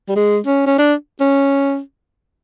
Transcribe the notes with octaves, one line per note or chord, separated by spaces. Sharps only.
G3
G#3
C#4
C#4
D4
C#4